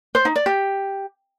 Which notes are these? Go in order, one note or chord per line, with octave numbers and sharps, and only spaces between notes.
C5
D#4
D5
G4